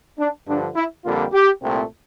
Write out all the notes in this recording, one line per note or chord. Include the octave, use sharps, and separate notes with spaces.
D4
G2 D3 F3 D4
E4
F2 D3 G3 A#3 F4
G4
C2 A#2 A3 C4